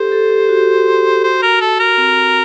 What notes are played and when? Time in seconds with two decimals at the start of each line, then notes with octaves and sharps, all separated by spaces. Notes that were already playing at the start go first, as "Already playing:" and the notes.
Already playing: G4 A4 C5
0.12 A4
0.30 G4
0.49 F#4
1.24 C5
1.42 A#4
1.61 A4
1.80 A#4
1.98 C4